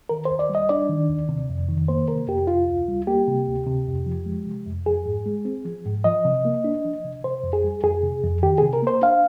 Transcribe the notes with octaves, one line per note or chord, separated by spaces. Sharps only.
D#3 A#4
C5
D#2
D5
G3
D#5
D4 D5
D#3
D#2
C3
F2
D#3
A#3 C5
C3 A#4
F2 G4
C3 F4
D2
G3
A#3 G4
C3
D2
C3
F2
F3
G#3
C3
F2
F3 G#4
G#2
G#3
C4
F3
G#2
F3 D#5
C3
A#3
D4
F3
C3
C3 C5
F2
G#4
G3
F2 G#4
C3
F2
D#3 G4
C3 G#4
A#4
A#3 C5
D4 F5